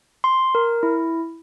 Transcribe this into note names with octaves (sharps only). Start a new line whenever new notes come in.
C6
A#4
E4